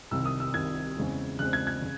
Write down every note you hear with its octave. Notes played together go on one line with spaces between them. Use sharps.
C2 C3 D#3 E6
D#6
E6
C2 C3 D#3 G#6
E2 C#3 G#3 C4
E2 C#3 G#3 C4 F#6
G#6
G#6
C#3